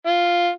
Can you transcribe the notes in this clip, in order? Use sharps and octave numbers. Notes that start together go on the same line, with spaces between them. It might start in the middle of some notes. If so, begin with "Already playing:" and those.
F4